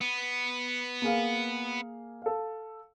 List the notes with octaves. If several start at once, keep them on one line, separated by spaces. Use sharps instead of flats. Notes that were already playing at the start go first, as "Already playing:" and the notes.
B3
A#3 G#4 F5
A4 F5